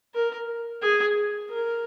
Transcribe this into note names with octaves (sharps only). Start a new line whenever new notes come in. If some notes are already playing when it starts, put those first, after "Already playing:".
A#4
G#4
A#4